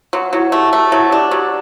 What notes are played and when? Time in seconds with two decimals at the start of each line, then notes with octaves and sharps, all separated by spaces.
0.13 F#3 F#4
0.33 F#3 E4
0.52 A3 G4
0.73 A3
0.92 F#3 E4 E5
1.11 D4 G4
1.31 F#3 G4